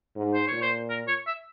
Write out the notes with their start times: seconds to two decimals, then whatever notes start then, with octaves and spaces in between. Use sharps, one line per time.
0.16 G#2
0.34 C5
0.48 A#2 C#5
0.62 C5
0.89 A#4
1.08 C#5
1.27 E5